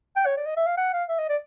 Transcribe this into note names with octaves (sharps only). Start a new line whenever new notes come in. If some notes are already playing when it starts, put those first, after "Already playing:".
G5
C#5
D5
D#5
E5
F5
F#5
F5
E5
D#5
D5